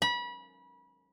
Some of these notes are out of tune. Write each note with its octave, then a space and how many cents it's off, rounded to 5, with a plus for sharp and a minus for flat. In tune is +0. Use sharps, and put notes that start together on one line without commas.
B5 -30